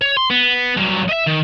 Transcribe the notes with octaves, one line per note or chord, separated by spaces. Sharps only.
C#5
C6
B3
G2 F#3
D#5 E5
D#3